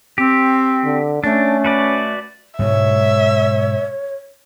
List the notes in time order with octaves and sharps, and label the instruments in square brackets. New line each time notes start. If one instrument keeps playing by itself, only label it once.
[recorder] C4 [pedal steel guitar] G4
[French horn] D3
[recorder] A3 [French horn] C#4 [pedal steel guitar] D4
[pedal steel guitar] F#4 B4 D5
[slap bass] G#2 B2 G#3 [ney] C#5 [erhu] E5